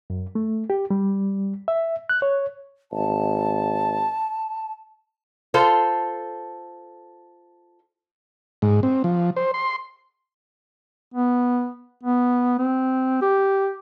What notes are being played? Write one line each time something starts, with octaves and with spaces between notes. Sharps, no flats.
F#2
A3
G4
G3
E5
F#6
C#5
G#1 A5
F4 A4 C5
G#2
C4
F3
C5
C6
B3
B3
C4
G4